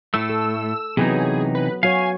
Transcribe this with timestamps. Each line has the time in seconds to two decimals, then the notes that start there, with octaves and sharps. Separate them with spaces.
0.14 A2 A3 E6
0.30 A4
0.97 C3 E3 F#3 B3 D#4 G#4
1.55 B4
1.83 F#3 F#4 C#5 F5 G#5